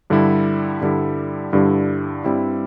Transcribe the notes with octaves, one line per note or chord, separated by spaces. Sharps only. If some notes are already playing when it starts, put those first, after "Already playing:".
G2 D3 G3 E4
G2 D3 G3 E4
G2 D3 G3 E4
G2 G3 C4 E4